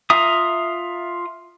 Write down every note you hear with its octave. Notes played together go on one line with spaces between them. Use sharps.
F4 E5 A#5 D#6